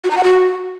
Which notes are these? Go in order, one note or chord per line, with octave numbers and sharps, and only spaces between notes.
F#4
A#5
F#5
F#4